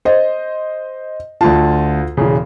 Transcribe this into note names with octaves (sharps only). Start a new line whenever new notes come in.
C5 D#5
D2 F4 A5
E1 C#3